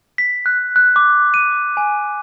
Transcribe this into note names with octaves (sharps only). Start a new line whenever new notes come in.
B6
F#6
F#6
D6
D#7
G#5